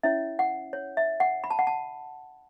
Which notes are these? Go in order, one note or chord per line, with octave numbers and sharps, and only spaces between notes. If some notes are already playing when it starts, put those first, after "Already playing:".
C#4 E4 C#5 E5
F#5
C#5
E5
F#5
B5
A5
F#5
A5